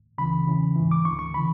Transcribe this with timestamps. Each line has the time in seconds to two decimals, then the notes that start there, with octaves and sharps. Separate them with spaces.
0.18 C#2 C#3 E3 B5
0.47 E2 C#3 E3
0.76 G#2 E3
0.91 D6
1.05 D2 D3 C#6
1.19 C#6
1.34 C#3 E3 B5